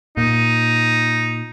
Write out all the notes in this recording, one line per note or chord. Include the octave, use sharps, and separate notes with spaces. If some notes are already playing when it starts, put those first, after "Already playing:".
A#2 D#4